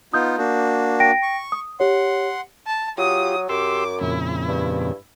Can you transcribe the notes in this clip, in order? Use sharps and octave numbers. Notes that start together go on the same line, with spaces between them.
B3 D#4 F4 D#6 G6
A#3 D4 F#4
G5 A#6 D7
C#6
D#6
G4 C#5 F#5 C6
A5
F#3 F4 G4 D#6
F#2 G4 C6 D6 E6
F2 A#2 C#3 E4
G2